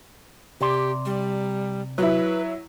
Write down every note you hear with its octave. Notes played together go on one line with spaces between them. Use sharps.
C3 G4 D5 C6
G3
F#3 E4 B4